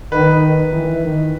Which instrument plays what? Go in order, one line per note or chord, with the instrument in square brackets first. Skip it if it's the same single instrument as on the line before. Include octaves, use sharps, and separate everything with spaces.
[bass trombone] D#3 [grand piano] B4
[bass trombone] E3
D#3